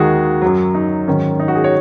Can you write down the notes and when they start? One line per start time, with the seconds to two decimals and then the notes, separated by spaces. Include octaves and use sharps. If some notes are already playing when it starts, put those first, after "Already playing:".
Already playing: D#2 D#3 G#3 F#4 G#4
0.42 F#2 F#3
0.75 D#4
1.08 G#2 D#3 F#3 C#4
1.40 D#4
1.48 F#4
1.55 G#4
1.64 C#5